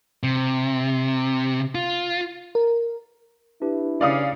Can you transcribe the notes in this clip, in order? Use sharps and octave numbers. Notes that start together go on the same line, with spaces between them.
C3
F4
A#4
D4 E4 G4 B4
C#3 D5 F5 D#6